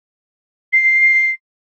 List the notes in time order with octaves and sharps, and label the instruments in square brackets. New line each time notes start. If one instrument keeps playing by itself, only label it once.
[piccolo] C7